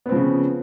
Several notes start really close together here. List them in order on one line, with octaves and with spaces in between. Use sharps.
B3 C4 F3 C#3